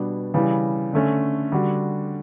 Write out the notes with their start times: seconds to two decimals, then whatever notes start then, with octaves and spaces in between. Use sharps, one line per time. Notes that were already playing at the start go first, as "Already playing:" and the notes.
Already playing: B2 G3 B3 D4 F#4
0.34 C#3 E3 G3
0.93 D3 A3 C#4
1.52 D3 G3 D4 F#4